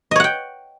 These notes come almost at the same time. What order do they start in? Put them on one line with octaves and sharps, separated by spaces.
D#5 C#5 F#5 G5